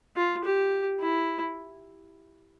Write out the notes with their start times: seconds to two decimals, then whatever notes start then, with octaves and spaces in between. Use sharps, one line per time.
0.16 F4
0.44 G4
1.00 E4